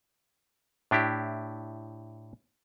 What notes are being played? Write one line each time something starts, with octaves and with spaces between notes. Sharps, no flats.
A2 D4 E4 G4